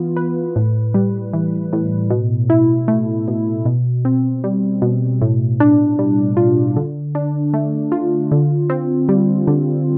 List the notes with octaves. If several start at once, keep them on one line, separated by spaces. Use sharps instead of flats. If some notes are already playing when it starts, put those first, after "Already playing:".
Already playing: E3 B3 F4
B4
A2
G3
E3
A2
B2
E4
A3
B2
B2
C4
G3
B2
A2
D4
G3
F4
D3
D4
A3
F4
D3
C4
G3
D3